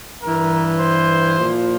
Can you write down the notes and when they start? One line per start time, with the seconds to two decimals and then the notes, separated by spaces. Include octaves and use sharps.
0.23 G2 E3 A#4
0.80 C5
1.38 A#2 F3